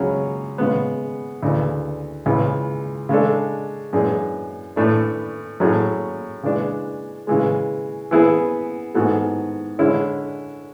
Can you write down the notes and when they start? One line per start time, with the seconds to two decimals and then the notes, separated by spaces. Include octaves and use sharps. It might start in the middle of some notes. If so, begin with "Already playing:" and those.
Already playing: C#2 C#3 F#3 C#4
0.58 C#3 G#3 B3
1.43 D2 C#3 E3
2.26 C#2 C#3 E3
3.09 C#3 G#3 D4 A4
3.93 F#2 E3 G#3 D4 G#4
4.76 A2 E3 A3 D4
5.60 A2 F#3 A3 C#4 G#4
6.43 C#3 E3 G#3 D4
7.27 C#3 E3 G#3
8.11 E3 B3 E4 G#4
8.94 G#2 E3 B3 F#4 A4
9.79 D3 G#3 C#4 E4